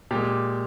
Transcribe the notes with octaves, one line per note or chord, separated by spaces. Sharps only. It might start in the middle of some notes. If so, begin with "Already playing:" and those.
A#2 G#3 G4